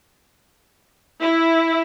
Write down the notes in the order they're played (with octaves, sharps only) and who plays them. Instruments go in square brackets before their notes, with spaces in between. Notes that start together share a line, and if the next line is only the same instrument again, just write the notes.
[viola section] E4